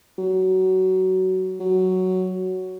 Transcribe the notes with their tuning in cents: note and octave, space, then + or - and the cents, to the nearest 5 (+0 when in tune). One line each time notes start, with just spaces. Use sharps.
F#3 +20
F#3 +5